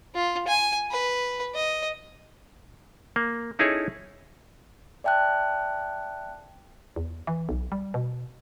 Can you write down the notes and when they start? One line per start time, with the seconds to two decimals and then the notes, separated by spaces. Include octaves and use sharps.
0.15 F4
0.47 G#5
0.90 B4
1.55 D#5
3.16 A#3
3.59 C#4 D#4 E4 G#4 A4 C#5
5.04 D5 E5 G5 A5 F#6
6.96 E2
7.27 E3
7.49 B1
7.72 G3
7.94 B2